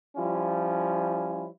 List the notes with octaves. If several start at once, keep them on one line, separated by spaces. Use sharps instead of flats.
F3 G3 C#4 E4 F4